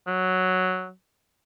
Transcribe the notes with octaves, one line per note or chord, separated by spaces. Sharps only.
F#3